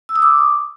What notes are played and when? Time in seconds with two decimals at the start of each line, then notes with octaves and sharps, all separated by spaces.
0.09 E6
0.16 D#6
0.22 D6